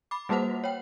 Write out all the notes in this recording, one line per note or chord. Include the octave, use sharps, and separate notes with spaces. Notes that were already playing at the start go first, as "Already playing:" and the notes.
B5 D6
G3 A#3 F#4 B4 C5 F#5
C#5 G5